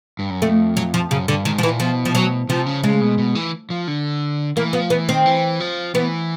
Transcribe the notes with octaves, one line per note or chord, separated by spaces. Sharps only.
G2
F#2
F2 A3
F#3
F3
F#2 C#3
G2 D3
G#2 D#3
F3
A#2 E3
B2 F3
F3
F#3
C3 F3
C#3
C#3 G#3
B2
B2
E3
F3
D3
E3 A#3
F3 B3
E3 B3
D#3 C4
E3
F3
E3 B3